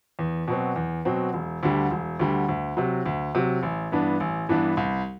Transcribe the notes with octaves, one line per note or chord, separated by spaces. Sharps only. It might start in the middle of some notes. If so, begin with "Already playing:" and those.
E2
B2 F#3 C4
E2
B2 F#3 C4
E1
D2 D3 G3
E1
D2 D3 G3
D2
C3 F#3
D2
C3 F#3
A1
G2 E3 B3 D4
A1
G2 E3 B3 D4
C2